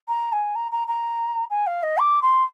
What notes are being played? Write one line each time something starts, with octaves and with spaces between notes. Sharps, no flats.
A#5
G#5
A#5
A#5
A#5
G#5
F5
D#5
D6
C6